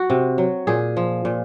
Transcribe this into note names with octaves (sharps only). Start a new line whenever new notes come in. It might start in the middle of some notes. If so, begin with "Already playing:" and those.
Already playing: F#4
C3
F#3
A#2 G#4
F3
A#2